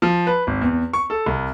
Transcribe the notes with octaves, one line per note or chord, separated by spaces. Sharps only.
F3
B4
G#1
E2
C#6
A4
C2